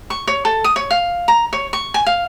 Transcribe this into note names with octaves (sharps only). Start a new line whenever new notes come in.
C#6
C#5
A4
D#6
C#5
F5
A#5
C#5
C#6
G#5
F5